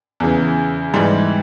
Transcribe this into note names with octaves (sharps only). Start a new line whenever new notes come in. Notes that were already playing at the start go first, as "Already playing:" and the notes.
E2 C#3 E3
G#2 E3 G3